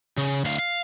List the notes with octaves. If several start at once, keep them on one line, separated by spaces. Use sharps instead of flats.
C#3
D2 F5
F5